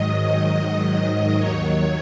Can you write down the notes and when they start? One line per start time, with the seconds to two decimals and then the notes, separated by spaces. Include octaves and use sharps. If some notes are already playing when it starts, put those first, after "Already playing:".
Already playing: G#2 D#3 F#3 D#5
0.24 D#5
1.38 D#2 D#3 F#3 C#5